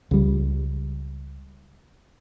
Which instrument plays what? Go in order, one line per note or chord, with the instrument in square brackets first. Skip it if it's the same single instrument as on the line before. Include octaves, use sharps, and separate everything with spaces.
[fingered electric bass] C#2 G3